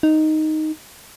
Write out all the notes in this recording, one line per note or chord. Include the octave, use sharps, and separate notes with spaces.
D#4